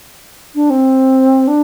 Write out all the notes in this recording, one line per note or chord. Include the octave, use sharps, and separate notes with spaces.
D4
C4
D4